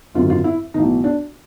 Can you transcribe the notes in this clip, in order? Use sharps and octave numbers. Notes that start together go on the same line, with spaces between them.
G#1 F#2 D3 F4
F4
E4
B1 A2 E3 D#4
D4